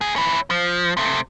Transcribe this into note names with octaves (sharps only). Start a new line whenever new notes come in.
D2 G#4
C#4 E4
F3
C3 A3